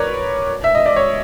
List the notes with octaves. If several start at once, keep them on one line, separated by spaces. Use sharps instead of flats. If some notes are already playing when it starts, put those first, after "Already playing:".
Already playing: A#4 B4 C#5 D5
E5
D#5
D5
C#5